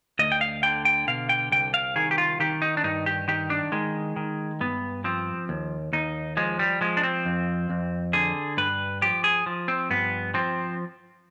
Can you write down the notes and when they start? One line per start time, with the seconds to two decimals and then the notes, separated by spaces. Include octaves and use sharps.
0.19 D2 D#5
0.32 G5
0.41 F5
0.63 D3 G5
0.85 G5
1.07 B2 F5
1.29 G5
1.52 C2 G5
1.74 F5
1.96 D#3 G#4
2.11 G4
2.18 F4
2.40 D#3 G4
2.62 D#4
2.77 D4
2.84 G2 D#4
3.06 G4
3.28 D#3 G4
3.50 D4
3.72 D#3 G#3
4.16 D#3
4.60 G2 B3
5.04 F3 C4
5.49 D#2
5.93 D#2 D#4
6.37 F3 G#3
6.59 G3
6.81 F3 G#3
6.97 D4
7.03 C4
7.26 F2
7.70 F2
8.13 D3 G#4
8.57 G2 B4
9.02 F3 G4
9.24 G#4
9.46 F3
9.68 C4
9.90 G2 B3
10.34 F3 C4